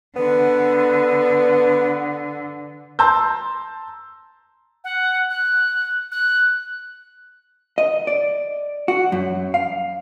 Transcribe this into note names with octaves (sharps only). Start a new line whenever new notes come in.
D3 B3
A5 A#5 C6 E6 G6
F#5
F#6
F#6
D#5
D5
F#4
F#2
F5